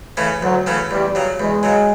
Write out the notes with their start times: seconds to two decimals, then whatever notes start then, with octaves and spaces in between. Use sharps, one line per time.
0.17 C#3 E3 A3 C#4
0.41 D2 F#3
0.66 C#3 E3 A3 C#4
0.91 E2 G3
1.15 C#3 F#3
1.39 E2 G#3
1.63 C#3 F#3